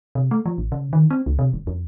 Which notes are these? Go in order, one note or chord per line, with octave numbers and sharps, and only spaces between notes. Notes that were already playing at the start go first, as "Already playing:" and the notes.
C3
A3
F3
A1
C#3
D#3
C4
C#2
C3
F#1
F2